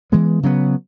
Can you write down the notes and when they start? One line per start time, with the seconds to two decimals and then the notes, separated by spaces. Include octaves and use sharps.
0.12 E3 G#3 B3
0.43 C#3 F#3 B3